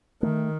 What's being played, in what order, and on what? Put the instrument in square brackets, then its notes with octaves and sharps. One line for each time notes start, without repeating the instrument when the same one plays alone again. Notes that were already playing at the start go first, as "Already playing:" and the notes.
[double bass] D#3 [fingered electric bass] A3